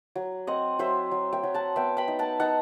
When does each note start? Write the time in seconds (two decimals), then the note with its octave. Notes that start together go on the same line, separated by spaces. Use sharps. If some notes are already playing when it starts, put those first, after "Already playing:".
0.15 F#3
0.47 C4 D#5 F#5
0.79 F#3 C5 E5
1.12 F#3
1.33 E5 G5
1.43 F#3
1.54 F#5 A5
1.76 B3 E5 G5
1.97 G5 B5
2.08 D#4
2.19 F#5 A5
2.40 D#4 F#5 A5